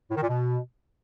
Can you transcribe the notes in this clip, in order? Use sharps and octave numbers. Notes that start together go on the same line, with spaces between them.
A2
D#3
A#2
B2